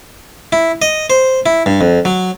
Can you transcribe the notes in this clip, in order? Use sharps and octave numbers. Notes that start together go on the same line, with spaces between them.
E4
D#5
C5
E4
G2
F2
F#3